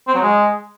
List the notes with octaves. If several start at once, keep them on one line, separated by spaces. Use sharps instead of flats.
C4
F#3
G#3